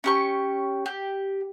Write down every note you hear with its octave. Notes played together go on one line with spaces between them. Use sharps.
C#4 G4 C#6
G4